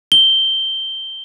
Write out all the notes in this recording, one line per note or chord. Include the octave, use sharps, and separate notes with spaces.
G7